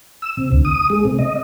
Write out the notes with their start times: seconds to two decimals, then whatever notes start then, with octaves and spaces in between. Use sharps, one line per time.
0.22 E6
0.37 C3
0.52 D2
0.65 D#6
0.90 G#3
1.05 C3
1.19 D#5